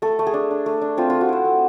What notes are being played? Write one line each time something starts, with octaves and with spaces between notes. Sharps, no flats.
A3 A4
A3
G#4
D4
D4
A3
D4
C4 F4
A3 F4
F#4
E4 C5
A3